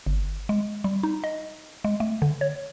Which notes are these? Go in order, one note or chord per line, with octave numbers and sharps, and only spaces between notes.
G1
G#3
G3
D#4
D#5
G#3
A3
D3
C#5